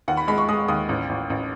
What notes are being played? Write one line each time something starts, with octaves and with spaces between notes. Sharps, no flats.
D#2 F#5
B5
G#3 B5
C#6
G#3 D#6
D#2 D#6
A1
A1
A1